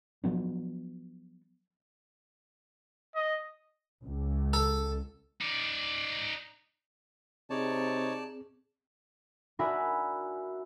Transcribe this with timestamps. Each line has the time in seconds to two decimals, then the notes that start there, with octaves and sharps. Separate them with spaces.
0.24 F3 F#3 B3 D4
3.15 D#5
4.03 C#2
4.53 A4
5.41 D#4 D5
7.50 C3 C4 D#4 G#4 C#5 D5 A5
9.59 D4 F#4 A#4 E5 G#5 B5